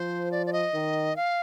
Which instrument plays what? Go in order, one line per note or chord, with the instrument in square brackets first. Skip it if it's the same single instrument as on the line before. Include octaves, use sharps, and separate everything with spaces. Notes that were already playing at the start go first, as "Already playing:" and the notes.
Already playing: [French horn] F3 [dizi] C5
[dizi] D5
D5
D#5
[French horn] D#3
[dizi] F5